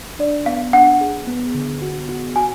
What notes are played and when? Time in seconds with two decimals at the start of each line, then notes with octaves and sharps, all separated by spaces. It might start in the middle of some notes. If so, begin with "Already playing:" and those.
0.19 D4 D5
0.46 B3 F5
0.73 D4 F#5
1.01 G#4
1.27 B3
1.55 D3
1.82 F#4
2.09 F#4
2.36 F#4 G#5